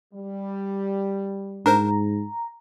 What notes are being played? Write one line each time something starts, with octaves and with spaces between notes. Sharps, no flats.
G3
G#2 D4 A#4 C5 A#5